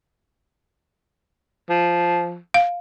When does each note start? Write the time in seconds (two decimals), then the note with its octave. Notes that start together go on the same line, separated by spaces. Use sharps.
1.70 F3
2.54 F5